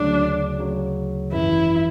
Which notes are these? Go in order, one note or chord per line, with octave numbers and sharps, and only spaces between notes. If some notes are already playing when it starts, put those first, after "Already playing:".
Already playing: D2 C#3 F#3 D4
D2 C#3 F#3
G#1 F#2 E3 E4